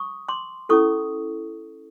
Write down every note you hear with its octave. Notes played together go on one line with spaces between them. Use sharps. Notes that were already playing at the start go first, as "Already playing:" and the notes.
Already playing: C#6 D#6
C6 D6
C#4 E4 A4 C#6 D#6